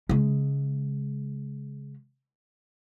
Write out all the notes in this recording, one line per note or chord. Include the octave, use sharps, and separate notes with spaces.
C#3 G#3